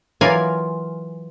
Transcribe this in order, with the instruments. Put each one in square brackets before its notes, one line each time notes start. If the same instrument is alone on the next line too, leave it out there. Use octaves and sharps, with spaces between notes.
[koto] E3 F#3 F4 A#4 D5 G#5